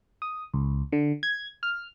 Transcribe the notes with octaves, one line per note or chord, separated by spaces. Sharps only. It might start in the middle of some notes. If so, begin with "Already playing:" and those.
D#6
C#2
D3
G#6
F6